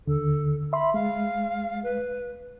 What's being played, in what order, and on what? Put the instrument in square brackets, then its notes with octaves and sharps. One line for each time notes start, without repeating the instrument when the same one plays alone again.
[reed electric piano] D#2 D3 [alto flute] A4
[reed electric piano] E5 C6 [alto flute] B5
[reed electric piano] G#3 [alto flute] F5
[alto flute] B4